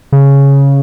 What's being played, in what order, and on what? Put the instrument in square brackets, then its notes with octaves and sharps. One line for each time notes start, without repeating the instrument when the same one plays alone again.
[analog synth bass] C#3